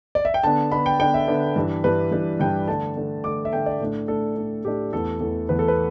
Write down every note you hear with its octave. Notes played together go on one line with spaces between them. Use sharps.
D5
E5
G5
D3 B3 D4 A5
D3 B3 D4 B5
G5
D3 B3 D4 G5
E5
D3 B3 D4
G2 E3 G3 D4
G2 E3 G3 D4 B4
G2 E3 G3 D4
G2 E3 G3 D4 G5
D3 A3 D4 A5
D3 A3 D4
D3 A3 D4 D6
E5
D3 A3 D4 G5
D5
A2 A3 D4
A2 A3 D4 A4
A2 A3 D4
A2 A3 D4 G4
E2 E3 A3 A4
E2 E3 A3
E2 E3 A3 B4
A4
B4